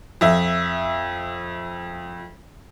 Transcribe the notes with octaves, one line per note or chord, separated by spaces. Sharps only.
F2 E5